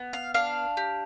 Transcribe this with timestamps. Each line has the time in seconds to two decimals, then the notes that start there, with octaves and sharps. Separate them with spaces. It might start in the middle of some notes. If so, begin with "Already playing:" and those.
Already playing: B3
0.13 F5
0.34 D4 F5
0.77 G4